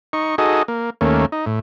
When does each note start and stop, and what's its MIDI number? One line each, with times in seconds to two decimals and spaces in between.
0.13 0.36 63
0.13 0.36 85
0.38 0.63 63
0.38 0.63 66
0.38 0.63 68
0.38 0.63 69
0.38 0.63 75
0.68 0.90 58
1.01 1.26 39
1.01 1.26 57
1.01 1.26 58
1.01 1.26 61
1.32 1.45 63
1.46 1.60 45